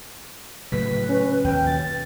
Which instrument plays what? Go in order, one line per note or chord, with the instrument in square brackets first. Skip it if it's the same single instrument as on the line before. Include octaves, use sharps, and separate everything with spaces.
[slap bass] A2 C#3 F#3 [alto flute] B4 [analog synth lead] B6
[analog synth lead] C#4
[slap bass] D#2 B2 [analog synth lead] G5
[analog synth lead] A6